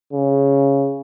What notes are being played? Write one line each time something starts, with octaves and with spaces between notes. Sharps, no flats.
C#3